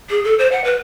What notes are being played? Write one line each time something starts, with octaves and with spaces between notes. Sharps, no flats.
G#4
A4
C5
F#5
B4